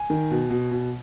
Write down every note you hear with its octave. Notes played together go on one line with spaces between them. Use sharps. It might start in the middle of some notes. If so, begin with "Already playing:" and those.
Already playing: G#5
D#3
B2
B2
B2